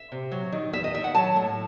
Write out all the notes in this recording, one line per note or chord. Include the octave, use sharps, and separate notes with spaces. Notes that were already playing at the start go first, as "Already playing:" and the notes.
Already playing: E5
C3
F#3
D#3
E2 E5
D#5
D#3 E5
F#5
F#3 A5
A2